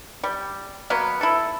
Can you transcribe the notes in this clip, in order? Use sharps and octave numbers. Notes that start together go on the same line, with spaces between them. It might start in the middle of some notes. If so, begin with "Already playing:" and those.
G3
F#3 A#3 B3 B4
E4 A4